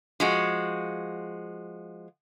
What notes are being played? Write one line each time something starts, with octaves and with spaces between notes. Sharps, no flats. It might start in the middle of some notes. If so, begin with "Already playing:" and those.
F3 G#3 F#4